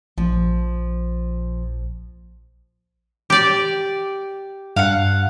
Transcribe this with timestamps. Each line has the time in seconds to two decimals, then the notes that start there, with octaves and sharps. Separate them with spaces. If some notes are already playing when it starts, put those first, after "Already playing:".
0.18 A#1 F3
3.30 G4 D5
4.76 G2 F5 F#5